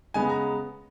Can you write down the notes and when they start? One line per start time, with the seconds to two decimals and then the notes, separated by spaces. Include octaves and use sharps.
0.14 C#3 G#3 B3 G#5
0.29 A#5